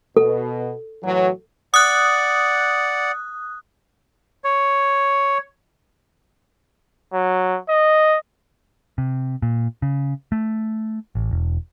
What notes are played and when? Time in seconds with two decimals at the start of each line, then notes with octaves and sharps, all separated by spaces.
0.17 B2 A4
1.03 A2 E3 F#3
1.74 D5 F#5 D#6 F#6
4.44 C#5
7.13 F#3
7.69 D#5
8.98 C3
9.42 A#2
9.82 C#3
10.32 A3
11.15 A1
11.31 E1